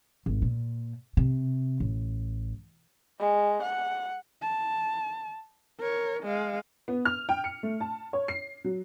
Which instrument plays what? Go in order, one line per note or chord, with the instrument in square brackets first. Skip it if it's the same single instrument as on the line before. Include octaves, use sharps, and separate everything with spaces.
[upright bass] G#1
A#2
C3
A1
[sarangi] G#3
F#5
[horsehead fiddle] A5
A#4 C#5
G#3 F5
[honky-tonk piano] B3
F6
G5
C#7
A3
A5
C#5
C7
F#3